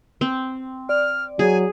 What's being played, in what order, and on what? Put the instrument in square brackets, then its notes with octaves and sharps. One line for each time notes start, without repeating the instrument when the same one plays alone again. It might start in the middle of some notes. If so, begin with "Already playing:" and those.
[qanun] C4
[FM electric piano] D5 [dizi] F6
[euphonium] F#3 [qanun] G#4 [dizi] G#5